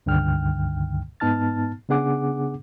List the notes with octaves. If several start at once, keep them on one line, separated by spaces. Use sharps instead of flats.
C#2 G2 D3 D#3 G5 F6
G#2 B3 D#4 A5 F6 A6
C#3 B3 D4 G#4 F#5 D6